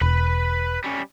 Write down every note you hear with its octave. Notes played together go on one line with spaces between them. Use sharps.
E1 B4 B5
G3 C#4